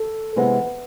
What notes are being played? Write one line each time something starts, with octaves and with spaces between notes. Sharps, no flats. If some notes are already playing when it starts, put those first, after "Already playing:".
Already playing: A4
C3 E3 G#3 B3